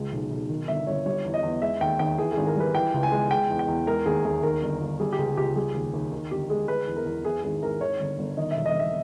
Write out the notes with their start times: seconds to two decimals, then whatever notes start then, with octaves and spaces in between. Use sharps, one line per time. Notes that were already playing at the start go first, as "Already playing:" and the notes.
Already playing: C#2 G#3
0.12 B1
0.31 B1
0.49 D#3
0.68 G1 E5
0.87 G1 C#5
1.06 G3 C#5
1.25 E2
1.34 D#5
1.43 E2
1.62 G#3 E5
1.81 D#2 G5
1.99 D#2 G5
2.18 E3 G#4
2.32 G#4
2.37 G#1
2.46 A#4
2.56 G3 B4
2.75 E3 G5
2.94 C#2
3.03 G#5
3.12 G#3
3.31 G#3 G5
3.50 E2
3.59 G5
3.68 E2
3.87 G#3 A#4
4.06 D#2 G#4
4.25 D#2 G#4
4.43 D#3 A#4
4.62 G1
4.81 G1
5.00 G3 G#4
5.13 G4
5.18 C#2 G#4
5.37 C#2 G4
5.56 G3 G#4
5.74 D#2
5.94 D#2
6.12 D#3
6.31 G1 G4
6.50 G#3 G#4
6.68 G#3 B4
6.87 E2
6.96 A#4
7.06 E2
7.25 E3 G#4
7.43 G#1 G#4
7.62 G#1 A#4
7.81 D#3 C#5
8.00 G1
8.19 G1
8.37 D#3 D#5
8.51 E1 E5
8.66 D#5
8.75 E1 E5